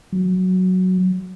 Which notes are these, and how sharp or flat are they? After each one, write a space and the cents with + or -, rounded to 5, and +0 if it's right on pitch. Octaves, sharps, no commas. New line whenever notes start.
F#3 +0